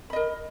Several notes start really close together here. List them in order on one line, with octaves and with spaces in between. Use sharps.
B5 D#5 A#4